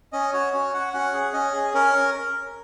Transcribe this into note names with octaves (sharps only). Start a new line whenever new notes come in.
C#4 D#5
F#4 C#5
C#4 C#5
F#4 F#5
C#4 F#5
G#4
C#4 D#5
G#4
C#4 A#4